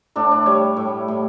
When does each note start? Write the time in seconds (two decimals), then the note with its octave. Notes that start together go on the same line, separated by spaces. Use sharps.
0.16 A2 D4
0.31 D4
0.46 G3 C#5
0.77 A2
1.08 A2